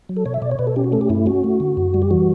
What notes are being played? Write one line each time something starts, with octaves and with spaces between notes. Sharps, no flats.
F#3
A4
B2 C#5
E5
B2 D5
C#5
B2 B4
A4
C#4 G4
F#4
A3 A4
G4
G2 E4
C#4 F#4
A3
D3
F#2
G3
G4
E3 F#4